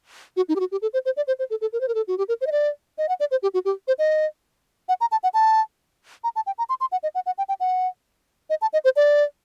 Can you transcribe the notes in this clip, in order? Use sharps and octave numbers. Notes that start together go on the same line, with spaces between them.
F#4
D#4
G4
F#4
G4
A4
C5
C5
D5
C5
C5
A4
A4
A#4
C5
A#4
A4
F#4
G4
A#4
C5
D#5
D5
D#5
F#5
D5
C5
G4
F#4
G4
C5
D#5
F#5
A#5
A5
F#5
A5
A#5
A5
G5
A#5
C6
C6
F#5
D#5
F#5
F#5
G5
G5
F#5
D#5
A5
D#5
C5
D5